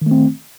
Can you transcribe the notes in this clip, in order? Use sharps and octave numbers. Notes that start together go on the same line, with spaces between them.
D#3 A3 C4